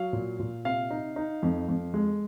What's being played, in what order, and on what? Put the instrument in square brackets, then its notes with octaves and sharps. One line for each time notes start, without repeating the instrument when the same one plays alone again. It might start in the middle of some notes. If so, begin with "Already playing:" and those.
Already playing: [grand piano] F#3 F5
A#2
A#2
C3 F5
D#4
D#4
F2
F2
G#3